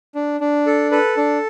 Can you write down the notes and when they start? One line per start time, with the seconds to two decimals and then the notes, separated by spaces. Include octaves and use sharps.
0.15 D4
0.40 D4
0.67 A4
0.92 A4 B4
1.17 D4